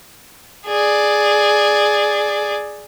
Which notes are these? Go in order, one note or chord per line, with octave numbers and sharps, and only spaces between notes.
G#4 D5